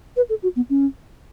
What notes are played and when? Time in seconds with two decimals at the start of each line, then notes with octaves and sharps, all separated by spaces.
0.16 B4
0.29 A4
0.43 F#4
0.56 B3
0.70 C#4